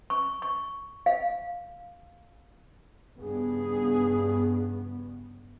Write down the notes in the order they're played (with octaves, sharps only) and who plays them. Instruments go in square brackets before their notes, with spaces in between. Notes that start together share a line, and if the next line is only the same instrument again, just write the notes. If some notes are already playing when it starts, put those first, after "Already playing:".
[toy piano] C#6
C#6
F5
[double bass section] G2 C#3 B3 [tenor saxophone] G#4